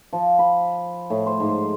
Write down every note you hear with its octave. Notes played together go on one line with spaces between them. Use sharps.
F3
B5
A2
C5
G#2